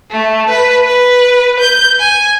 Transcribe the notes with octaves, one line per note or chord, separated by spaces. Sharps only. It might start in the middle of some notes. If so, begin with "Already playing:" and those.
A3
B4
B4
G6
G#5